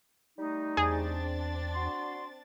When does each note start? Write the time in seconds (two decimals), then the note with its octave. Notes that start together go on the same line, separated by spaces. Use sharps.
0.38 G3 A3 D#4
0.77 E2 C4 D4 G#4 A6
1.74 F#4 D5 C6